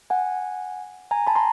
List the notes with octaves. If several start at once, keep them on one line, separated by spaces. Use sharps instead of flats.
F#5 G#5
G#5 A#5
A5 B5
A#5 C6